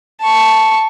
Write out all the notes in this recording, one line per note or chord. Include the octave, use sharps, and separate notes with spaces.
A5 C#6